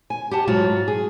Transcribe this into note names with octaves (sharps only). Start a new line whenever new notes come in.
G#5
G4 F#5 A5
G#2 F#3 F4 F#4
G#4